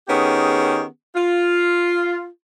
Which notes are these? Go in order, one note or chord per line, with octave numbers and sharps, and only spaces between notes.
D#3 B3 C#4 G4 G#4
F4